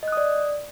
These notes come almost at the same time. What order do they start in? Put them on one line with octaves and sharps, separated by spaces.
D#5 F#6 D#6 D5